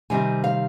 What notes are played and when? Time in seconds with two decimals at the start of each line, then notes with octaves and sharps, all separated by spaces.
0.10 C3 D#3 G3 C4 G#5
0.44 F5